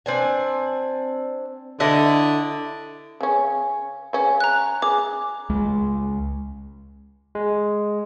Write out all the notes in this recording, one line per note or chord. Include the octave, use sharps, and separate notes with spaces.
C4 D4 G#5
D3 E4 A4 D#5
C#3 C#4
C#3 C#4
A#5 F#6
G#4 D6
C#2 G#3
G#3